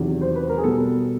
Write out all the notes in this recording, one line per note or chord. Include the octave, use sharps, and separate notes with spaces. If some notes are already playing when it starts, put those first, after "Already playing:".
Already playing: E2 C3 D#3 F#3
C5
B4
A#4
G#4
B2 G3 B3 A4